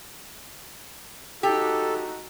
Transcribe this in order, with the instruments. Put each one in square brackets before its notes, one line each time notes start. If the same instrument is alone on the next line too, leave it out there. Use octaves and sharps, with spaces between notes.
[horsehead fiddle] D#4 F#4 [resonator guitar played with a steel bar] G4 [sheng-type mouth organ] A4